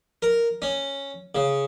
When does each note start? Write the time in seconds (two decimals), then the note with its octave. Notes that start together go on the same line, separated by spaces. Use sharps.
0.22 A#4
0.62 C#4
1.35 C#3